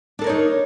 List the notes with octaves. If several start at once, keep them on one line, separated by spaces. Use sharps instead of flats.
D4 D#4 A4 A#4 C#5